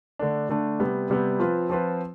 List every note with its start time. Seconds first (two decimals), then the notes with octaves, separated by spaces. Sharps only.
0.19 D3 A3 D4
0.49 D3 A3 D4
0.79 C3 G3 B3
1.10 C3 G3 B3
1.39 F3 C4 F4 B4
1.70 F3 C4 F4 B4